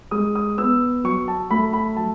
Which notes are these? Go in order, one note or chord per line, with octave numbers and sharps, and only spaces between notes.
G#3 D#6
D#6
B3 E6
F#3 C#6
A5
A3 B5
B5
F#3 A5